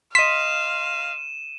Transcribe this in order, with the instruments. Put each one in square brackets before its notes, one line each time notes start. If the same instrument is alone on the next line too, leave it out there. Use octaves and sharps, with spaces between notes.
[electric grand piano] D#5 C6 [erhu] F5 [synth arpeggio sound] B6 [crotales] D#7 E7